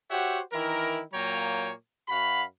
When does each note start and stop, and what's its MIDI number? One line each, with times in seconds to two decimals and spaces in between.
0.11 0.40 66
0.11 0.40 67
0.11 0.40 72
0.11 0.40 73
0.11 0.40 76
0.11 0.40 78
0.52 1.00 51
0.52 1.00 52
0.52 1.00 64
0.52 1.00 70
1.13 1.71 46
1.13 1.71 54
1.13 1.71 58
1.13 1.71 73
1.13 1.71 79
1.13 1.71 82
2.09 2.43 42
2.09 2.43 66
2.09 2.43 77
2.09 2.43 83